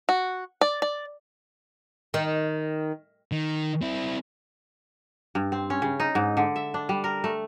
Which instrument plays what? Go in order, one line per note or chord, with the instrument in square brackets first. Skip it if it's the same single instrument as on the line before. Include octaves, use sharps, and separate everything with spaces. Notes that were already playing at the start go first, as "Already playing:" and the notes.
[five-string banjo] F#4
D5
D5
[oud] D#3
[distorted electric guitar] D#3
C4 E4
[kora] G2
C4
C#4
C#3
D#4
G#2
D3
E5
D4
G3
A#4
A3